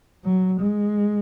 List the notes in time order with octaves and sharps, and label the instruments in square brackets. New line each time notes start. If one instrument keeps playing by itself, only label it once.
[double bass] F#3
G#3